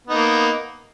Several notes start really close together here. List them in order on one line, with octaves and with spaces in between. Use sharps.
B3 D#4 A#3